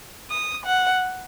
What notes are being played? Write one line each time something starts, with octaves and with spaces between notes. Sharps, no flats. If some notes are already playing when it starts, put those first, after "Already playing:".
D#6
F#5